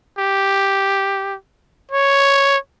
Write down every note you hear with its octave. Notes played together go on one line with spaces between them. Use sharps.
G4
C#5